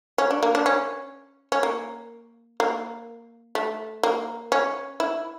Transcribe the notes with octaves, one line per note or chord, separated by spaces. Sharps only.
C#4
D4
A#3
D4
C#4
C#4
A#3
A#3
A3
A#3
C#4
E4